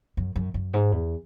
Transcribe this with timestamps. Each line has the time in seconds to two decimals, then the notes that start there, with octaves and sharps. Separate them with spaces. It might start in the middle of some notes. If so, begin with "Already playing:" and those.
0.17 F#2
0.36 F#2
0.54 F#2
0.73 G#2
0.92 E2